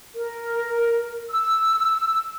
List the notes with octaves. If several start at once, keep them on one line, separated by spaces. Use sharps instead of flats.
A#4
E6